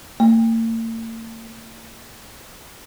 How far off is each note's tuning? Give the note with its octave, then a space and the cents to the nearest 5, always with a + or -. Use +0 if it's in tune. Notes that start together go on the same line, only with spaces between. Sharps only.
A#3 -45